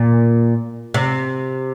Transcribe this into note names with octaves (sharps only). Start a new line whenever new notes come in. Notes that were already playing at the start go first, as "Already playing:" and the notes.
Already playing: A#2
C3